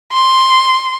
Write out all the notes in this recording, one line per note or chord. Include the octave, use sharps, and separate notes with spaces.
C6